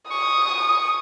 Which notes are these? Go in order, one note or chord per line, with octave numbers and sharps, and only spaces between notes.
C#6 D#6